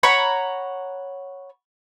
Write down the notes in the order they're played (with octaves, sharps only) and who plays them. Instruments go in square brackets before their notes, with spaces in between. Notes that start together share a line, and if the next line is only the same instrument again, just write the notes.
[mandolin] C#5 F#5 A#5 B5